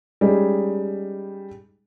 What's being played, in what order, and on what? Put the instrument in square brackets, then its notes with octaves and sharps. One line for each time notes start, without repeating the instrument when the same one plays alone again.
[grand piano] G3 G#3 C#4 D#4 G#4